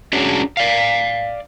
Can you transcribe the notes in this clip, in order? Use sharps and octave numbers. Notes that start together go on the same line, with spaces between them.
C#4 D4 F#4 G#4 C#5 D5
D5 F5